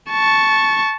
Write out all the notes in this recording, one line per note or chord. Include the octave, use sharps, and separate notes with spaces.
A5 C#6